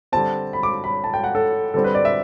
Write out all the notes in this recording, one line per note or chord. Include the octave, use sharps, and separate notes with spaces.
D3 G3 C4 A5
B5
D6
B5
A5
G5
F#5
A4
D3 G3 C4 A4
B4
D5
E5